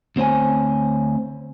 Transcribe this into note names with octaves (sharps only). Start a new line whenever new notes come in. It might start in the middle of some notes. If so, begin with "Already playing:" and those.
D2 C4 C5 C#5 G#5